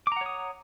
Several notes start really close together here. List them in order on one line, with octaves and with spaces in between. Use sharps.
D6 A#5 F#5 C#5 D#6